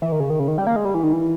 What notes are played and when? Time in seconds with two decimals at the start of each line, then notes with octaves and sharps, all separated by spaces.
0.02 E3
0.12 D#3
0.20 C#3
0.30 D#3
0.40 C#3
0.48 D#3
0.58 G3
0.67 A#3
0.76 G#3
0.85 G3
0.94 E3
1.03 D#3
1.13 E3